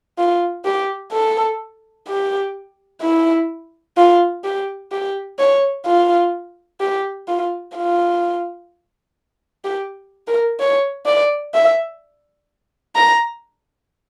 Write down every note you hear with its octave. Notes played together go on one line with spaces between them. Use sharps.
F4
G4
A4
G4
E4
F4
G4
G4
C#5
F4
G4
F4
F4
G4
A#4
C#5
D5
E5
A#5